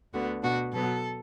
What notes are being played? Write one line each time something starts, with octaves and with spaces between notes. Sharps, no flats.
D2 D3 B3 F#4
B2 B3 D4 F#4
B2 F#3 B3 A4